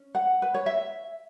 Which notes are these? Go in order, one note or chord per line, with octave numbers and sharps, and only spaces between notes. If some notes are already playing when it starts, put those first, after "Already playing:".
Already playing: C#4
F#5
B4
C#5
E5